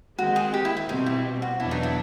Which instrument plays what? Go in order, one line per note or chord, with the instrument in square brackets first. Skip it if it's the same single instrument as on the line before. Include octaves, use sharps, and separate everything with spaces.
[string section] D#3 G#3 C4 [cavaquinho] F#4
[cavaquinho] G#4
G4
E4
E4
[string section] B2 G3 C4 [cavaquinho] D#4
[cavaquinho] E4
F#4
[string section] E2 B2 F#3 B3 D4 [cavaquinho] E4
[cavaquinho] D#4
E4